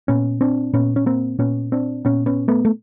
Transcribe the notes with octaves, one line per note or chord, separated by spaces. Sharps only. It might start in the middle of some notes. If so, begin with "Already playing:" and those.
A#2 B3 C#4
C4 D4
A#2 B3 C#4
C#4
A#3 C4
A#2 B3 C#4
C4 D4
A#2 B3 C#4
B3 C#4
A3 B3
A3